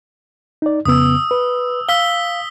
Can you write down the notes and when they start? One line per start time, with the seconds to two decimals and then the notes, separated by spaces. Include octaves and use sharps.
0.62 D#4 D5
0.85 F2 C#3 B3 D#6 E6
1.31 B4
1.89 F5 E6 B6 G7